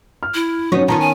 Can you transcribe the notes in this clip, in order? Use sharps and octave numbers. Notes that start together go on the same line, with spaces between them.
F6
E4
F#3 B3 C#4 D#4 C#5
D#3 B3 C#4 F4 A5 A#5
G#5